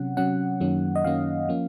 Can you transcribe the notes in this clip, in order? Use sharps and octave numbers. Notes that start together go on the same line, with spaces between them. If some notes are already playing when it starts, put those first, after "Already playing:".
Already playing: C3 F#3 C#4 F#5
C3 F#3 C#4 F#5
F#2 D#3 F#3 A#3 C#4
D#5
F#2 D#3 F#3 A#3 C#4 F5
F3 A#3 C#4